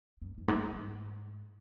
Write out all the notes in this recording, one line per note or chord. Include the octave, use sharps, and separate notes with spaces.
F#2
E2
G#2
F#2
G#2